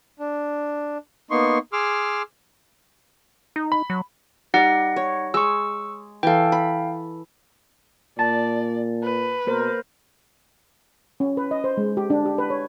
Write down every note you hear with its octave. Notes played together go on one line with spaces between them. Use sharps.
D4
A#3 B3 D#4 C6 C#6
G#4 C6 D6 E6 F6
D#4
B5
F#3
G3 D#4 D5 F#5 A#6
C#5
G#3 C#6 E6
E3 A4 F5 G5
B5
A#2 D5 A5
B4
B2 A#3 A#4 C5
C#4
B4
D#5
C5
G#3
G4
D4
G4
B4
C#5